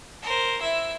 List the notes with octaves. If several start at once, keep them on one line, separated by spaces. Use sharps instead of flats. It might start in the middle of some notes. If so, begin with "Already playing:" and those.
A#4 C5
E4 E5